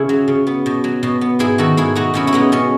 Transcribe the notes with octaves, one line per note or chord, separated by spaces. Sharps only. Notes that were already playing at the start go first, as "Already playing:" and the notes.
Already playing: C#3 E4 G#4
F#3
C#3
B3
B2
F#3
B2
B3
G#2 E4 G#4
D#3 F#4 A4
G#2 E4 G#4
A3 D#4 F#4
B2 C#4 E4
E4
G#3 B3 D#4
B2 C#4